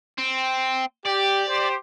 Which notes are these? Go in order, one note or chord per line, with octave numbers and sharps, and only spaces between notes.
C4
G4 D5
G4 C5